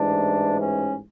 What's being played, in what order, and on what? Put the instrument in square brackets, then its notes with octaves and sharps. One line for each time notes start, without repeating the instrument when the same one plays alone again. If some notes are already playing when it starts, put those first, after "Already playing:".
Already playing: [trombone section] A1 G#2 E3 D4
C#4